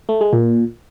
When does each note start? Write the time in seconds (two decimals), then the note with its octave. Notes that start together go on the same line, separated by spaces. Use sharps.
0.09 A3
0.21 G#3
0.33 A#2